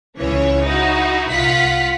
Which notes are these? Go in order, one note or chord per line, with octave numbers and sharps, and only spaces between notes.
C#2 C#3 E3 C#4 C#5
D#4 E4 F#4
C2 F4 F#5 B6